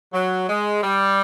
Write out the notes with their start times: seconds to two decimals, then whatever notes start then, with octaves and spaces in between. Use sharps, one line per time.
0.13 F#3
0.48 G#3
0.83 G3